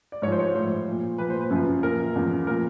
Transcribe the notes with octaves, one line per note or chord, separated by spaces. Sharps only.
D5
G#2 F3 C#5
C5
C#5
A2 F3 C5
A#2 F3
A#2 F3 B4
C5
B4
F#2 C#3 F3
A#2 F3 A#4
E2 C#3 F3
A#2 F3 A#4